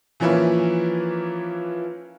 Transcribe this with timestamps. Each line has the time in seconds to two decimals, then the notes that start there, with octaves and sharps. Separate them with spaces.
0.20 E3 F3 A#3 C#4 E4 B4